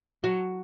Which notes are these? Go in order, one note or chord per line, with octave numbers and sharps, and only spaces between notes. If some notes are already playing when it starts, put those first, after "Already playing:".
F#3 F#4